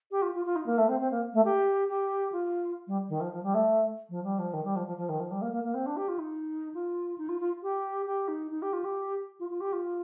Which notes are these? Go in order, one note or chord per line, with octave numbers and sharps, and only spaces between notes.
G4
F4
F4
F4
D#4
A#3
A3
C4
C4
A#3
A3
G4
G4
F4
G3
D#3
F3
F3
G3
A3
F3
G3
F3
D#3
G3
F3
F3
F3
D#3
F3
G3
A#3
A#3
A#3
C4
D4
G4
F4
D#4
F4
D#4
F4
F4
G4
G4
D#4
D#4
G4
F4
G4
F4
F4
G4
F4